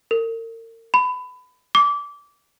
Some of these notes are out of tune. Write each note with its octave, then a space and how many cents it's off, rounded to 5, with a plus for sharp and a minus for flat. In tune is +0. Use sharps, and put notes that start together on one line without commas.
A#4 -40
B5 +25
D6 -20